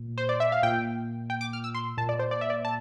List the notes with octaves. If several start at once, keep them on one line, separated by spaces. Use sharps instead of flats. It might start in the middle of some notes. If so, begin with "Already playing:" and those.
Already playing: A#2
C5
D5
E5
F5
A#2 G5
G5
D6
F6
E6
C6
A#2 A5
D5
C5
D5
E5
D5
A5